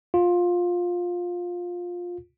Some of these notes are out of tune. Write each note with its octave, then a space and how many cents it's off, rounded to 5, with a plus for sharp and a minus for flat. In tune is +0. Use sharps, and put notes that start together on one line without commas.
F4 +15